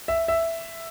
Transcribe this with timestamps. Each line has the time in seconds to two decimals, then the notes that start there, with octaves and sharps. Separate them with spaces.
0.08 E5
0.28 E5